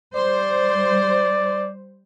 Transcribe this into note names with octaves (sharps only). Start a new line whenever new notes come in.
G3 C5 D5